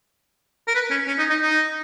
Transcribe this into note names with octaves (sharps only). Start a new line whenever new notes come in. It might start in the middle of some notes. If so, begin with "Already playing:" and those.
A#4
B4
C#4
C#4
D#4
D#4
D#4